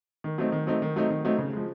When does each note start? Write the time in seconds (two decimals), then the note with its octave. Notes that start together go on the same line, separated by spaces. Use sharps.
0.24 D#3
0.38 F#3 A3 C4 D#4
0.52 D#3
0.67 F#3 A3 C4 D#4
0.82 D#3
0.96 F#3 A3 C4 D#4
1.10 D#3
1.25 F#3 A3 C4 D#4
1.39 C#3
1.53 F3 G#3